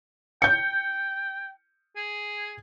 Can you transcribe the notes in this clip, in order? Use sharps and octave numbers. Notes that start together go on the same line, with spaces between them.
G5 G6 C#7
G#4